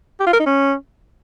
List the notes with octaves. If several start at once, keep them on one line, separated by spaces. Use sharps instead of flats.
G4
F4
A#4
D#4
C#4